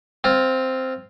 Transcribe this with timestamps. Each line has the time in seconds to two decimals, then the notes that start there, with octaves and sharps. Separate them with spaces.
0.24 C4 F4